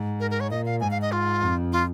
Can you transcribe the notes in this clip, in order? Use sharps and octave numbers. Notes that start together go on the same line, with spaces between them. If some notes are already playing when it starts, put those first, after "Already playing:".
Already playing: G#2
A#4
A#4
C#5
A#2 D#5
F5
G#2 G#5
F5
D#5
F4
F2
F4